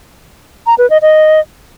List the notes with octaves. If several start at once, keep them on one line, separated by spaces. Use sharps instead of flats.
A#5
B4
D#5
D#5